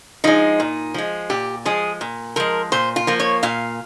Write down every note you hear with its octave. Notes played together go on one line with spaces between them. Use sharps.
F3 G#3 D#4
A#2
F3 G#3
A#2 G4
F3 G#3 G#4
A#2
F3 G#3 A#4
A#2 C5
F4
F3 A#3
C#5
A#2 F5